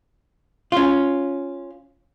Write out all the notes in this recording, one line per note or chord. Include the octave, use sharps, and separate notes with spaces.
C#4 F4